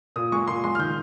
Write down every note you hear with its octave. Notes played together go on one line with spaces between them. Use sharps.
A#2 D#6
G#3 C#6
A#2 C6
G#3 C6
F6
D#3 G6